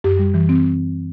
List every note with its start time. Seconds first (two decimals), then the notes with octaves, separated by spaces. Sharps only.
0.04 F#2 G4
0.19 G3
0.34 E3
0.49 C4